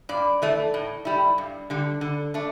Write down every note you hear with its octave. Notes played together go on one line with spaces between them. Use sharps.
G2 D5
E3 A3
A2
G3 E4
G2
D3 G3
D3
A3 D4